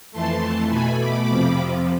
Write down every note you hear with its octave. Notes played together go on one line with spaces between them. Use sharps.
F2 E3 A3 A5 C6
B2 A3 G#5 B5
B5 D6
F2 C3 F3